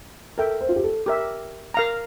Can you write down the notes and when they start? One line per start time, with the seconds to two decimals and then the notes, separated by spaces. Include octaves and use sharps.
0.38 A4 A#4 E5 G5
0.61 C5
0.69 F4
0.76 G4
0.83 A4
1.06 G4 A#4 E5
1.74 A#4 F5 A#5